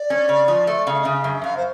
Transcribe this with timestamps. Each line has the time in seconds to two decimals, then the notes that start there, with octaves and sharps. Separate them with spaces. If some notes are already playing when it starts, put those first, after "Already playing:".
Already playing: D5
0.10 C#4
0.29 C#3
0.48 F3
0.67 A3
0.86 C#3 F5
0.93 E5
1.01 D#5
1.05 C#3 E5
1.24 F#2
1.44 F#2 F5
1.57 C5